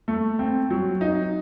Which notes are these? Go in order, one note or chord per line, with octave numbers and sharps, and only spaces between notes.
A3
C4
F#3
D#4